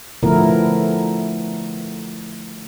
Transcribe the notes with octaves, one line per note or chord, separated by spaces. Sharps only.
D3 F3 A3 B3 E4 A#4